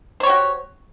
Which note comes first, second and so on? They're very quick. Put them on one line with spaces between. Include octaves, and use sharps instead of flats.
C5 C#5 G4 F#4